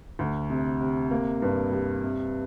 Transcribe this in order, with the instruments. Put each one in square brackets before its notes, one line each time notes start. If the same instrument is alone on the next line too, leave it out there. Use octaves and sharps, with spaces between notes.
[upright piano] D2
C3
C3
A#3
G2
G3
C3